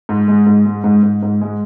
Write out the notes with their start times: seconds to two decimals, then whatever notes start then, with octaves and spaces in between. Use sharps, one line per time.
0.09 G#2
0.28 G#3
0.47 G#2
0.65 G#3
0.84 G#2
1.03 G#2
1.23 G#2
1.41 G#3